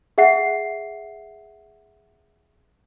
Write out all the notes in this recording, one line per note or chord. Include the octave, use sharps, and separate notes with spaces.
G#4 E5 F#5 C7